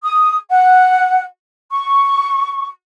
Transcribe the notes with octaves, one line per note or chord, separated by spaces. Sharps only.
D#6
F#5
C#6